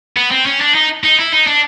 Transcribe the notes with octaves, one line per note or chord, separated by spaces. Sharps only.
B3
C4
C#4
D4
D#4
D#4
E4
D#4
D4